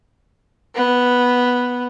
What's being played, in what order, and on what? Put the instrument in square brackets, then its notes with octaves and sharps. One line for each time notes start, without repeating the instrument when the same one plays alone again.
[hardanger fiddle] B3